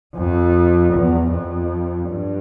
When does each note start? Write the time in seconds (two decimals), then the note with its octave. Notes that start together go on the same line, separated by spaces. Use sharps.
0.16 F2
0.93 E2
1.32 F2
2.09 G2